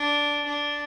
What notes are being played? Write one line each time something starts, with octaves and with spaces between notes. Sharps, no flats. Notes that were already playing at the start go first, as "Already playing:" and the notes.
Already playing: D4
D4